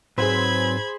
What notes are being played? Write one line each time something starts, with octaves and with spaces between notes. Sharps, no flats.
G#2 F#3 C4 G#4 B4 C5 B5 G#6